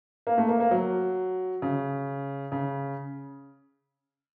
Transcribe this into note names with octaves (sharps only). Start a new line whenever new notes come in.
A#3
A3
A#3
A#3
F#3
C#3
C#3